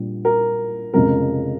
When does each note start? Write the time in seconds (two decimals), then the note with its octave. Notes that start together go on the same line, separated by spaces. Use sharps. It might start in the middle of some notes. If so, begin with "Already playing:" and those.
Already playing: A#1 A#2 G3
0.25 A#4
0.94 F1 F2 C#3 G#3 A#4